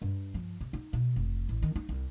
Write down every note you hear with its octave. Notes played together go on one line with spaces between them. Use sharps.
G2
F3
C3
D#4
B2
F1
A1
D#3
D#4
C2